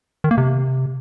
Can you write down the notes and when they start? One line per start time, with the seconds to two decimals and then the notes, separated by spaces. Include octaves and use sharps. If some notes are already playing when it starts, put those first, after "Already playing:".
0.24 D#3
0.31 A#3
0.38 C3